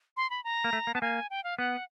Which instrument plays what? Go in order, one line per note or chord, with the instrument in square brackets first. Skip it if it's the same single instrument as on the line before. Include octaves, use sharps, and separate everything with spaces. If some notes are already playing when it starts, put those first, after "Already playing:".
[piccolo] C6
B5
A#5
[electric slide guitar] A#3
A3
A#3
[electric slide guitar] B3 [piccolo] A5
[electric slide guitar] A#3 [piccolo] G#5
[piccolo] G5
F5
[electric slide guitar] B3 [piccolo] F#5